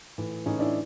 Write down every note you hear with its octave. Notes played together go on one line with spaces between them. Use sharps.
A2 E3
A2 E3 C#4 D#4
D4 E4